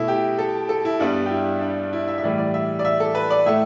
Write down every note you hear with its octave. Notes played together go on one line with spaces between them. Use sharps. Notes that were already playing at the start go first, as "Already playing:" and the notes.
Already playing: B2 A3 E4
G4
A4
A4
E4
G2 G3 B3 D4
G4
E4
D4
E4
E5
E5
A2 E3 G3 D5
D5
E5
D5
E5
A4
B4
D5
A2 A3 E5